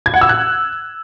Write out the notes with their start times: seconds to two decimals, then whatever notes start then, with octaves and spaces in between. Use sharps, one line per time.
0.06 G#6
0.14 F#5
0.21 E6
0.29 F#6